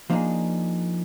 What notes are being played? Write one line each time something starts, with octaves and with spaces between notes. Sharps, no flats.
F3 A#3 B3 D4 D#4 G#4